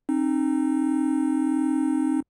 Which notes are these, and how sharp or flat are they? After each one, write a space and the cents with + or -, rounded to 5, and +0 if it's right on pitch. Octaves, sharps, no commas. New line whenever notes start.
C4 +35 D#4 -15